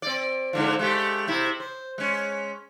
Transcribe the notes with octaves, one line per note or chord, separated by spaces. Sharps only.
C4 D5
G#2 D3 F3
G#3 A3 G4
C3 E4
C5
G#3 C#4